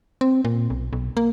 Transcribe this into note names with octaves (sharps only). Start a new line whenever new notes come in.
C4
A#2
B1
B1
A#3